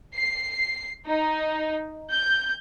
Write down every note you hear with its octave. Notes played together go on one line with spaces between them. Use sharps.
C7
D#4
G6